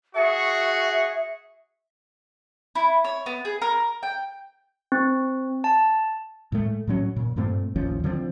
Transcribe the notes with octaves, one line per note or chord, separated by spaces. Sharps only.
F#4 G#4 E5 C#6
E4
C#5
B3
G#4
A#4
G5
C4
A5
A2 G#3 A3
A2 F#3 C#4
A#2
G2 A#2 A3 C4
A1 D#2 F3 C#4
D3 F3 G#3 C4